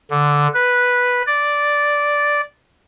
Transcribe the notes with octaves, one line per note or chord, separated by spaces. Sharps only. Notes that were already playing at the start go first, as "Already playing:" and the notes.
D3
B4
D5